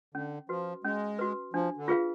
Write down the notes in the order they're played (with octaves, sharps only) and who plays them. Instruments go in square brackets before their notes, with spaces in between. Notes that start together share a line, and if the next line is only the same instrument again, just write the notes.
[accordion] D3 [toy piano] C#4
[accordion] F3 [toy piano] F#4 B4
[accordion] G#3 [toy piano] C#4
[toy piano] F#4 B4
[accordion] F3 [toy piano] D4
[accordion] D3
[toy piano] F4 G#4 B4 F5